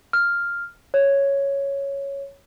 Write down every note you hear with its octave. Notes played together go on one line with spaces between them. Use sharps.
F6
C#5